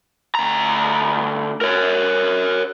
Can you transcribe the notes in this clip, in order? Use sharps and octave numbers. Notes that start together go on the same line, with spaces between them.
D2 A#5
A#4 C#5